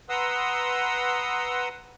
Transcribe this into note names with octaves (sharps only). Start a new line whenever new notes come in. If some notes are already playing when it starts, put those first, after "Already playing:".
B4 F#5 A#5 C6 D#6 E6